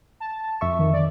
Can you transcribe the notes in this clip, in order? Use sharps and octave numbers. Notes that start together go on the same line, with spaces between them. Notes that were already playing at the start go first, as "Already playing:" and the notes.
A5
F2 E5 C#6
D#3
D5